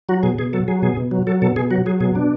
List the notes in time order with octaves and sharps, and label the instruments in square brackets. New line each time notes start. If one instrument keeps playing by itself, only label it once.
[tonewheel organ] F#3 F#4
B2 G#4
B2 G#4
F#3 A4
F#3 G#4
B2 G#4
B2
F#3
F#3 A4
B2 A4
B2 G#4
F#3 F#4
F#3 G#4
B2 G#4
B2 D4